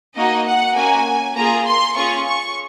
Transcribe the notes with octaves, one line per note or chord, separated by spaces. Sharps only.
A#3 D#4 F#4 D#5
F#5
A#3 C#4 F#4 G#5
A#3 F4 G#4 A#5
C6
C#4 F4 G#4 C#6
C#6